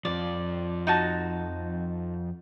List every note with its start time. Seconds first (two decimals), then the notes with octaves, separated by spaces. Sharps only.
0.05 F2 F3 D5
0.87 D#4 F#4 A5